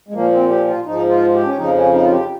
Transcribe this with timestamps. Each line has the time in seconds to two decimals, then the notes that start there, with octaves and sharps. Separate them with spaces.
0.08 G#3
0.13 A#2 F3 A#3
0.32 C4
0.50 G4
0.67 F4
0.86 G#2 F3 D#4
1.09 F4
1.33 G4
1.46 C#4
1.58 F2 C#3 F3 D#4
1.76 C#4
1.93 D#4
2.03 F4
2.11 G4